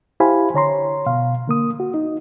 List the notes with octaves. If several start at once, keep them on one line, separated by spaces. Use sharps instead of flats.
E4 G4 C5 F5 G#5 B5
D3 C#5 A#5 C6
B2 F5
D3 A#3 D#6
F#4
D#4